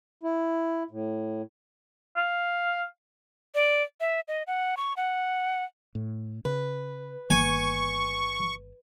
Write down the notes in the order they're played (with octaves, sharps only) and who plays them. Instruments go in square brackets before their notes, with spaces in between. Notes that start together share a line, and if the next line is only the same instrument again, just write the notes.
[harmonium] E4
A2
[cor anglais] F5
[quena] D5
E5
D#5
F#5
C#6
F#5
[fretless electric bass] A2
[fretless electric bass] C#3 [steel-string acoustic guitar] B4
[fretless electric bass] G1 D#3 A#3 [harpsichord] G#5 [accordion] C#6